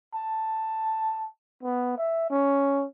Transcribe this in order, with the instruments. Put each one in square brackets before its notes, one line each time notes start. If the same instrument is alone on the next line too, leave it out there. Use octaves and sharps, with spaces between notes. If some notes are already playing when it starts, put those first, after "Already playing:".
[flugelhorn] A5
B3
E5
C#4